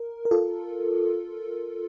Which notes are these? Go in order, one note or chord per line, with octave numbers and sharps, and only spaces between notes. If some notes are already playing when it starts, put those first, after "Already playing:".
Already playing: A#4
A#4
F4 A4